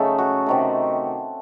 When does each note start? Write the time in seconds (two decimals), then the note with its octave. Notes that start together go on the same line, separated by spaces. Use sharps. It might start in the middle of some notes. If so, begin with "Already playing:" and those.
Already playing: C#3 F#3 A3 D#4 A4
0.18 F#4
0.46 C3 D#3 F#3 A3